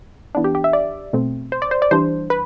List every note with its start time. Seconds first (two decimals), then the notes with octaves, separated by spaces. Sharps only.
0.35 E3 B3 D4
0.44 G4
0.55 G4
0.64 E5
0.73 D5
1.13 B2 A3 C4
1.52 C5
1.62 D5
1.71 C5
1.82 D5
1.91 E3 G3 D4 C5
2.30 B4